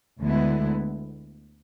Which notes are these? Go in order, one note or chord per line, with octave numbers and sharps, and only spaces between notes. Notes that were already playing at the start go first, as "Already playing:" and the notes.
D2 D3 G#3 B3 E4